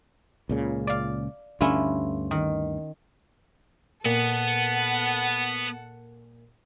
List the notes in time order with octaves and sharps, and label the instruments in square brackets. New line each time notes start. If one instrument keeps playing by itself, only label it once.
[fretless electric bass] C#2 A#2 C#3
[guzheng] D5 F5
[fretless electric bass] D2 G2 D3 [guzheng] C#4 E4 F4
[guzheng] D#3
[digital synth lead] A#2 [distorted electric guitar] B3 [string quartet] A4 F#5